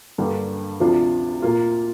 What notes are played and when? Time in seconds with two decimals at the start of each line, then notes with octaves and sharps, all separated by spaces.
0.18 G2 D3 G3 A#3 D4
0.80 D2 C3 F3 D4 F4
1.42 A#2 A#3 F4